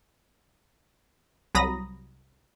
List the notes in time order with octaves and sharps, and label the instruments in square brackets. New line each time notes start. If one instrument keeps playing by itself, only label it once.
[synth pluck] C2 F#3 A#5 B5 D#6 A#6